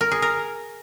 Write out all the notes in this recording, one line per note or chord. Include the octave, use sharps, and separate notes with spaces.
A#4
G#4
A#4